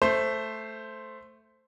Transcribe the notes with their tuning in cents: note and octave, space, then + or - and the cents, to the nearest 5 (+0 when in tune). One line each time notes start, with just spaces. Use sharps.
A3 +0 C5 +0